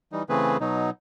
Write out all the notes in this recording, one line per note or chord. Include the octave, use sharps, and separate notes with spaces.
E3 G3 D#4
C#3 E3 A3 C4 G#4 B4
B2 F#3 D#4